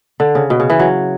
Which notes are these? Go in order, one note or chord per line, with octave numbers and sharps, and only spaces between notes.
D3
C#3
B2
C#3
E3
F#3